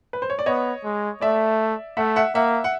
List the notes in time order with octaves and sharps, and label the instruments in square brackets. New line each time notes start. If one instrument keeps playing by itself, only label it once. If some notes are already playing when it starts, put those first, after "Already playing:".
[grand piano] B4
C5
C#5
D5
[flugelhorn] B3 [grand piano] C#5 D#5
[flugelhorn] G#3
[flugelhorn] A3 [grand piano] D5 E5
[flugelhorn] A3 [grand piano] E5 F#5
[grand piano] E5 F#5
[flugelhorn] A#3 [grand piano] E5 F#5
[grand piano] F#5